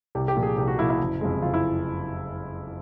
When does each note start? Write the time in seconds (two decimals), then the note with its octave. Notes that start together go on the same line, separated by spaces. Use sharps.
0.15 C2 G4
0.28 G4
0.36 A#2 F3
0.43 G#4
0.58 C2 G4
0.68 F#4
0.78 A#2 F3 E4
0.90 E4
0.99 F#1
1.21 F2 C3 F3 G#3
1.42 F#1 F4
1.54 E4